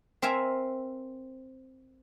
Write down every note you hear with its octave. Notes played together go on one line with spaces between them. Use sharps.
C4 A#4 E5 F5 G#5